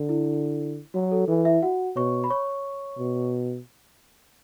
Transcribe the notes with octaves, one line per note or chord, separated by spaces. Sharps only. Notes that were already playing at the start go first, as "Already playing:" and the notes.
Already playing: D3
E4
F#3 F#4
A4
E3 A4
E4 E5
F#4 F#5
B2 C#5 C#6
B5
C#5 C#6
B2